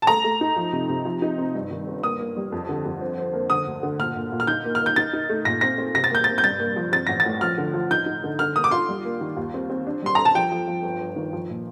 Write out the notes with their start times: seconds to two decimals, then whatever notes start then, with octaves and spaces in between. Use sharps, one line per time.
0.02 A5
0.07 A3 A#5
0.24 A3
0.41 D#4
0.56 F3
0.73 C3
0.89 C3
1.05 F3
1.22 D#4
1.38 C4
1.55 G2
1.71 D#3
1.87 G1
2.03 A#3 D#6
2.20 A#3
2.37 G3
2.52 F2
2.69 D3
2.85 F2
3.01 C5
3.18 C5
3.33 A#3
3.50 D3 D#6
3.67 D2
3.83 D3
3.99 A#2 F6
4.16 A#2
4.32 A#2
4.40 F6
4.47 D#4 G6
4.65 A#3
4.75 F6
4.80 A#4
4.86 G6
4.96 D#4 A6
5.13 D#4
5.29 A3
5.45 A#2 A#6
5.61 C4 A#6
5.78 C4
5.95 C3 A#6
6.04 A6
6.10 A#3 G6
6.24 A#3 A6
6.38 G6
6.44 G2 A6
6.60 A#3
6.76 F3
6.92 C4 A6
7.07 A1 A#6
7.20 A6
7.26 A2
7.41 F3 F6
7.58 D3
7.74 F3
7.91 D#4 G6
8.06 D#4
8.24 D3
8.39 D3 F6
8.55 A#3 D#6
8.64 D6
8.71 F4 C6
8.89 G3
9.05 A#3
9.21 D#3
9.37 D#2
9.54 C4
9.70 C4
9.87 D4
10.02 G3 C6
10.15 A4 A#5
10.25 A5
10.35 F3 G5
10.52 F3
10.68 F3
10.83 G1
11.01 G1
11.16 D#3
11.33 F3
11.50 A#2